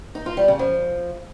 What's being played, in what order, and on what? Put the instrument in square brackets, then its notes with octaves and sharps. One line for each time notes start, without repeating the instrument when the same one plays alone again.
[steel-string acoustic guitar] D#4
F4
G3
C#3
F3